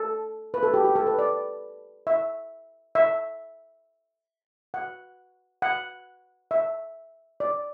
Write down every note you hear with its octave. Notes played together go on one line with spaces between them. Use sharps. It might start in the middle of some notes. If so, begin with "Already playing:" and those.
Already playing: A4
B4
A4
G4
G4
A4
B4
D5
E5
E5
F#5
F#5
E5
D5